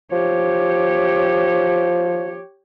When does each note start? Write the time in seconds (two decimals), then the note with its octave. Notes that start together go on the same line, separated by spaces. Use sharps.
0.12 F3 G4 C#5